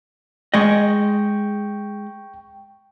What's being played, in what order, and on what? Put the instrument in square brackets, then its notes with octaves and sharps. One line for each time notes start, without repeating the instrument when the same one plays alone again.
[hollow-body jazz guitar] G#3 D#5 [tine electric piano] G5 C#6